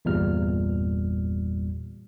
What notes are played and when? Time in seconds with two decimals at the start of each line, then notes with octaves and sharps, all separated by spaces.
0.05 G1 E2 A#2 G3 F6